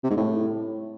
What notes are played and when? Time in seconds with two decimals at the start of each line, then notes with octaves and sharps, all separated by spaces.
0.04 C3
0.10 G#2
0.17 A2